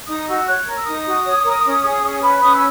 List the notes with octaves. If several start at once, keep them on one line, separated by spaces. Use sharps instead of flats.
D#4 D#6
F#4 E6
C#5 F#6
A#4
E6
D#4 D#6
F#4
C#5
A#4
C#4
G#4
C#4
B4
C#4 D#6
E6